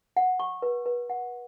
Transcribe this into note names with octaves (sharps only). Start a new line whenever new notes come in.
F#5
C#6
B4
B4
F#5